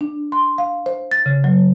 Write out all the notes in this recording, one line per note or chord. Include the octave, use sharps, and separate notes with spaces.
D4
C6
F5
C5
A6
C#3
F#3